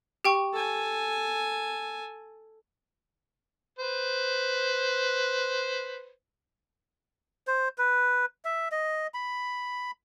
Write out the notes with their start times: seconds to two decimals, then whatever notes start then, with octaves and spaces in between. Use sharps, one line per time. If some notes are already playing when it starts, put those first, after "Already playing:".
0.25 G4 G5 C#6
0.53 A4 G#5
3.79 B4 C5
7.47 C5
7.78 B4
8.45 E5
8.72 D#5
9.14 B5